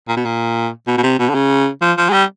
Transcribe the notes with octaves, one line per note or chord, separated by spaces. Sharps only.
A#2
B2
A#2
B2
B2
C3
B2
D3
C#3
F3
F3
G#3
G3